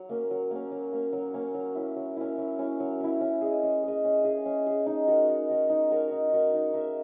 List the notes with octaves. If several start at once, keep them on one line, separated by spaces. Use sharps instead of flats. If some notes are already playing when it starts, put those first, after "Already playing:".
Already playing: F#3
A#3 C#4
F#3
A#3 C#4
F#3
A#3 C#4
F#3
A#3 C#4
F#3
C#4 E4
F#3
C#4 E4
F#3
C#4 E4
F#3
C#4 E4
C#4
G#4 D#5
C#4
G#4 D#5
C#4
G#4 D#5
C#4
G#4 D#5
D#4
F#4 A#4 C#5
D#4
F#4 A#4 C#5
D#4
F#4 A#4 C#5
D#4
F#4 A#4 C#5
D#4
A#4 E5